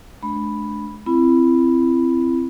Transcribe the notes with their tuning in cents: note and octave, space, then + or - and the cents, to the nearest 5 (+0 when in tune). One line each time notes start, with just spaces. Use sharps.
A3 -45 D4 +0 B5 +0
C4 +0 E4 +30 B5 +0